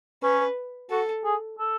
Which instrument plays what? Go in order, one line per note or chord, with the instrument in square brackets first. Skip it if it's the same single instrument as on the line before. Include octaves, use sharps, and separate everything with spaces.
[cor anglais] C#4 [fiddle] B4
[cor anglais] F#4 [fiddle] A4
[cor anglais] G#4
A4